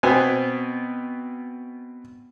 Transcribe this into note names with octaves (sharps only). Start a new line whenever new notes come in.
B2 B3 C4 G#5